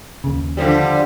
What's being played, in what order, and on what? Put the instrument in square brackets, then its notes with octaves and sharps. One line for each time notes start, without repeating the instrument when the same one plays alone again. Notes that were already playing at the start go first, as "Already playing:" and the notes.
[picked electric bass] D#2 C#3
[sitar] D3 F3 G3